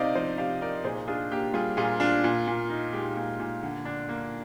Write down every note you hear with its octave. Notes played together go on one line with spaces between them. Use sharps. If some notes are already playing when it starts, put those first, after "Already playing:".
Already playing: C3 C4 D#4 D5 D#5 F5
F3 C5 D#5
C3 D5 F5
D#4 A#4 D5
A#2 G#4 C5
D4 F4 G#4
A#3 G4
G3 F4 G#4
A#2 F4 G#4
D4 F4
A#2
A#2
D#4
G#3 G4
A#2
A#2
D3
D4
A#3